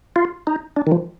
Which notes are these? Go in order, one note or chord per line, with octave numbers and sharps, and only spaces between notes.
F4
D#4
D4
D#3
F3